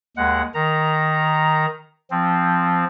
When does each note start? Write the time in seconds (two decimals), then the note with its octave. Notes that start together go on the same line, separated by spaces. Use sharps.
0.17 D#2 G#3 F#5
0.54 D#3 A#5
2.11 F3 C4